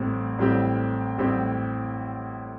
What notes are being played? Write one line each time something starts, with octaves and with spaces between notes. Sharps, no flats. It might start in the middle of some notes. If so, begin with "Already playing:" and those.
Already playing: A1 A2 G3 C4
A1 A2 G3 C4 G4
A1 A2 G3 C4 G4